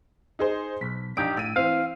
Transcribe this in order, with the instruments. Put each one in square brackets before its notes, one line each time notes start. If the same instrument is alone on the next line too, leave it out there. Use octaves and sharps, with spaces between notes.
[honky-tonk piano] D#4 G#4 C5
[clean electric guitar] B1 [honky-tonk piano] B6
[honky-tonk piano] A#1 D7 [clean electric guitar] D4 D#4 G4
[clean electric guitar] A2 [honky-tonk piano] E6 D#7
[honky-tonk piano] E3 C4 [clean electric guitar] F5